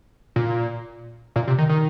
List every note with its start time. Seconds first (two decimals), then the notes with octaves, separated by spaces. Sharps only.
0.36 A#2
1.36 A#2
1.48 C3
1.58 D#3
1.69 D#3